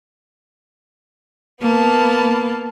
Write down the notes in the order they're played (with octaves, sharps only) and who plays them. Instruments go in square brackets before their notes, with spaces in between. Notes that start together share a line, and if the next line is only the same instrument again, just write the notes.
[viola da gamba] A#3 [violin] B3 A5